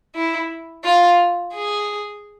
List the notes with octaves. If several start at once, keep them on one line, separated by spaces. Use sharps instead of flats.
E4
F4
G#4